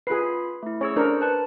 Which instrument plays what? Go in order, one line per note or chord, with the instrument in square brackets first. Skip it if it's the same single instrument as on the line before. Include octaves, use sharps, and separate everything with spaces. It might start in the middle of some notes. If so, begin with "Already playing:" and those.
[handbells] F4 B5 C7 [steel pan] G#4 B4
[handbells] A3 E4
[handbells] C#4 G#4 E6 [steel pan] C#5
[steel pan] D4 A#4 [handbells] C5
[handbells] B4 A5 F#6